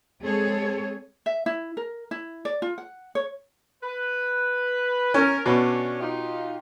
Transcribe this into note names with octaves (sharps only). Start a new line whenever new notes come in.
G#3 C4 G#4 A4 C#5
E5
E4
A#4
E4
D5
F4
F#5
C#5
B4
C#4 A#4
B2 C#4 D4
D#4 F4 G4